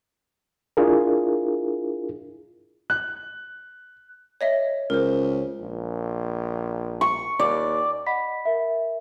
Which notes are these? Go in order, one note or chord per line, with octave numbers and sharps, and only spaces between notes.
D4 E4 F4 G#4 A#4
F#6
C#5 D#5 E5
C#2 A#4 C5
A#1
C#6
D#2 D5
D#5 F#5 B5 B6
A#4 E5